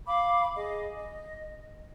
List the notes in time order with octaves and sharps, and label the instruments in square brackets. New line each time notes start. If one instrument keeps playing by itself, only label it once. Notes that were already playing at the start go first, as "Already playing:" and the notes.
[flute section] F5 B5 D6
G#4 D#5
D#5